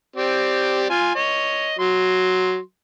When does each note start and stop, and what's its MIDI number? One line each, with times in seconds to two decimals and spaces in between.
0.16 0.89 60
0.16 0.89 67
0.16 0.89 74
0.90 1.10 65
0.90 1.10 80
1.15 1.78 73
1.15 1.78 75
1.79 2.58 54
1.79 2.58 84